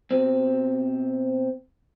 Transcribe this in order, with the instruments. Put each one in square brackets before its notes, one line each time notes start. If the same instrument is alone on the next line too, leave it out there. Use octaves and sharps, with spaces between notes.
[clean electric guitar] B2 C4